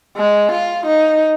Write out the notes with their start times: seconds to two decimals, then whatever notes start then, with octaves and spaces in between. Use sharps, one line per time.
0.16 G#3
0.51 F4
0.85 D#4